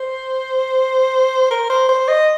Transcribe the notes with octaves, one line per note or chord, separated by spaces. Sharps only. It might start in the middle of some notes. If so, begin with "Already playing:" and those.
Already playing: C5
A#4
C5
C5
D#5